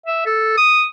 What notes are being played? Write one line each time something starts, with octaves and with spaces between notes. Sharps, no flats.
E5
A4
D#6